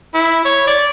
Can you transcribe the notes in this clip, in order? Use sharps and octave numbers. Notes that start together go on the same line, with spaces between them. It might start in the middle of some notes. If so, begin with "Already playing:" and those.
E4
C#5
D5